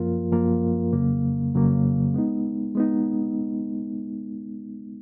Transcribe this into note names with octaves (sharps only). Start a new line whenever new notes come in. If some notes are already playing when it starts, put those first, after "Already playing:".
Already playing: F#2 F3 A#3 F4 A#4
F#2 F3 A#3 F4 A#4
F2 C#3 F#3 A#3
F2 C#3 F#3 A#3
G#3 B3 D#4
G#3 B3 D#4